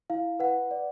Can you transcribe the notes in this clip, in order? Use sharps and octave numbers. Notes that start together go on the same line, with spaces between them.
E4 F5
B4 F#5
D5